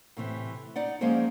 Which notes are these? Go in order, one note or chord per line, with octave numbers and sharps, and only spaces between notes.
A2 C3 E3
D#4 D5 F#5
F3 G#3 A#3 C#4 G#4 C5